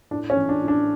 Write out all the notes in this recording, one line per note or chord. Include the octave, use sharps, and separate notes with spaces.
A2 D4
C#4
A1
D4
A2
D4